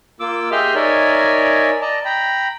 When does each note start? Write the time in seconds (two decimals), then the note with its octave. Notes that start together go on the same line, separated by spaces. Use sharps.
0.20 A#3 F4 D6 E6
0.52 G4 G#4 D#5 E5 C6 F6
0.75 D#4 A#4 C#5 D5 E5 G#5
1.82 D5 D#5 A5 A#5
2.05 G5 A#5 B5